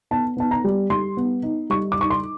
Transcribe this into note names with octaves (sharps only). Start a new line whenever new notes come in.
B3 A5
B3 A5
A#5
G3
G3 C6
B3
D#4
G3 C#6
D6
D#4 C#6
C6